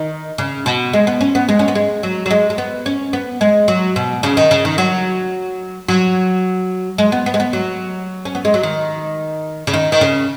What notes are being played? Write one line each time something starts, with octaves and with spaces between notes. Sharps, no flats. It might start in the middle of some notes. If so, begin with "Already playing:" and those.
Already playing: D#3
C#3
B2
G#3
B3
C#4
B3
G#3
C#4
B3
G#3
F#3
F#3
G#3
G#3
B3
C#4
B3
G#3
F#3
B2
C#3
D#3
C#3
D#3
F#3
F#3
G#3
B3
B3
G#3
B3
F#3
C#4
B3
G#3
F#3
D#3
C#3
D#3
D#3
C#3